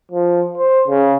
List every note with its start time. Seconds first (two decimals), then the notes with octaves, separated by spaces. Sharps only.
0.11 F3
0.58 C5
0.88 C#3